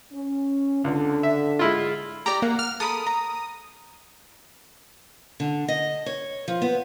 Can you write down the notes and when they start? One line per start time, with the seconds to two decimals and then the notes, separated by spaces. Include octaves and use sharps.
0.13 C#4
0.84 C#2 D3
1.23 E5
1.59 G#3 E4 F4
2.26 G4 D5 A#5
2.42 A#3 F#5
2.59 F6
2.80 A4 A#4 B5 D#6
3.06 A#5
5.40 D3
5.68 D#5
6.06 C#5
6.48 F3
6.62 B3